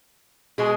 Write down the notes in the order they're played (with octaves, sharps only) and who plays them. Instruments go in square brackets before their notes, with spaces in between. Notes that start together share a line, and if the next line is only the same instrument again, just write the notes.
[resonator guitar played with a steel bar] B2 G#3 G#4